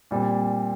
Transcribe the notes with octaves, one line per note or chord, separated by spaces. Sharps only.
A#2 G3 C4